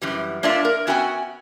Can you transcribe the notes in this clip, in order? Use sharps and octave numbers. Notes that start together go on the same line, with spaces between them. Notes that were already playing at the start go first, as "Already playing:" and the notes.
F#2 E3 G3
A#3 D4 F4 D5 E5
A#4
B3 C#4 F#4 E5 G5 G#5